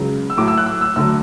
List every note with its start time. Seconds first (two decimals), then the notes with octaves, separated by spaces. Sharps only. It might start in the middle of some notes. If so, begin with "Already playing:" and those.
Already playing: C#2 C#3 F#3
0.30 E6
0.37 A2 F#3 A3 D6
0.48 E6
0.58 F#6
0.66 E6
0.81 E6
0.96 D2 D3 F#3 A3 E6